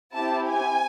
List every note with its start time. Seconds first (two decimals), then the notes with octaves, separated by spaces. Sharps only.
0.15 C4 E4 G4 A5
0.49 G#5